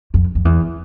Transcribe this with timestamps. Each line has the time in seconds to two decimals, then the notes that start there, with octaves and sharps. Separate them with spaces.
0.14 F2
0.35 F2
0.45 E2